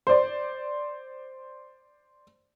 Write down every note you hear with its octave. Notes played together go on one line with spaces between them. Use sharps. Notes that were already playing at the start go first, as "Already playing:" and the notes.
C5 D5